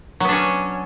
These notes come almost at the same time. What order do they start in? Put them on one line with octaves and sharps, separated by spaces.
F#3 B3 D4 C#4